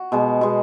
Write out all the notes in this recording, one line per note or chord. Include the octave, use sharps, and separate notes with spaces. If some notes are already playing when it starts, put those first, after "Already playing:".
Already playing: F#4
B2 G#3
B2 G#3